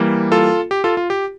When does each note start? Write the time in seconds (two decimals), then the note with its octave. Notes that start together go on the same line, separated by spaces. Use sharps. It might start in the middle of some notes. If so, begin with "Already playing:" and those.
Already playing: E3 G3 A#3
0.32 F4 A4
0.71 G4
0.84 F4 A4
0.97 F4
1.10 G4